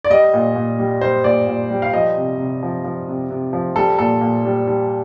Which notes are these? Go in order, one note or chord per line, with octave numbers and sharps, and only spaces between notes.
D5
G3 D#5
A#2
A#2
G3
G3 C5
A#2 D5
A#2
G3
F5
F3 D#5
C3
C3
F3
F3
C3
C3
F3
G3 A4
A#2 A4
A#2
G3
G3